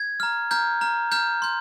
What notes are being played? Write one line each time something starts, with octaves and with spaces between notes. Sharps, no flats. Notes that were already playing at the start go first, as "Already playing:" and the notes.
Already playing: G#6
A#5 F6
A#5 F6 G6
A#5 F6
A#5 F6 G6
C6 G6